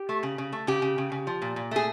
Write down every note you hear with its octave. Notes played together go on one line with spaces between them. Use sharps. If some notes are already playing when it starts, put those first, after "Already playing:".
Already playing: G4
A3
C#3
C#3
A3
C#3 G4
C#3
C#3
C#3
F3
A#2
A#2
A3 G#4